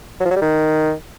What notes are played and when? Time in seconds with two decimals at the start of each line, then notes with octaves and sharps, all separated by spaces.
0.20 F#3
0.25 F3
0.31 F#3
0.36 G3
0.41 D#3